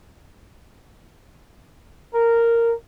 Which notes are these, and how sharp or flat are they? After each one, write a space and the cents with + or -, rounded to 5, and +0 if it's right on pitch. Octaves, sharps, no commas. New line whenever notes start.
A#4 -10